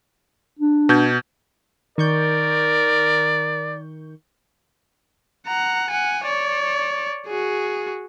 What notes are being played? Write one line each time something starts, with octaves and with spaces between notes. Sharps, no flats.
D4
B2 G6 G#6
D#3 A#4 D5 C#6 G6
F#5 A#5
F#5 G#5
C#5 D5
F#4 G#4